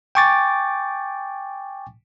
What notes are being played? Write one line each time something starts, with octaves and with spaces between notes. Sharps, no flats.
G5 G#5 C#6 D6 A6